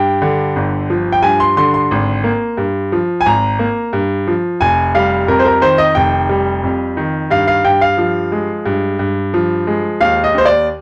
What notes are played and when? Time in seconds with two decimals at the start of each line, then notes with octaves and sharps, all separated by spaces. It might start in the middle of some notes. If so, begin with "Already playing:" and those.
Already playing: G2 G5
0.22 D3
0.56 G1
0.90 F3
1.12 G5
1.22 G2 G#5
1.40 C6
1.57 D3 C6
1.74 C6
1.91 G#1
2.24 A#3
2.57 G2
2.92 F3
3.21 G#5
3.26 G#1 A#5
3.59 A#3
3.93 G2
4.27 F3
4.61 F1 G#5
4.95 G3 F5
5.28 F2 A#4
5.39 C5
5.45 A#4
5.61 D#3 C5
5.78 D#5
5.95 F1 G5
6.29 G3
6.63 F2
6.97 D#3
7.31 G2 F5
7.48 F5
7.64 G2 G5
7.81 F5
7.98 F3
8.32 G#3
8.66 G2
8.99 G2
9.34 F3
9.67 G#3
10.00 D#2 F5
10.24 D#5
10.34 D#2 C5
10.45 D5